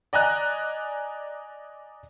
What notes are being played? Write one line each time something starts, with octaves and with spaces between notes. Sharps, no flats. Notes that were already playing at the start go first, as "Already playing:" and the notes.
D5 D#5 G#5 A#5 F#6